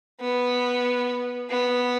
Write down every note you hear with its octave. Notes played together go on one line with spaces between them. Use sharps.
B3
B3